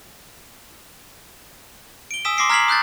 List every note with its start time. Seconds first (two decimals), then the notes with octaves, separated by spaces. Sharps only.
2.11 D7 G7
2.25 G#5 D#6 E6 B6 E7
2.37 C6 D6 A#6 C7 D7
2.50 A#5 F6 G#6 B6 C7 F#7
2.68 D#6 F#6 G6 A6